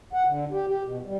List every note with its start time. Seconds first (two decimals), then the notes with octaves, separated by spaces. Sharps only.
0.13 F#5
0.27 D3
0.51 G4
0.67 G4
0.83 B2
1.05 G3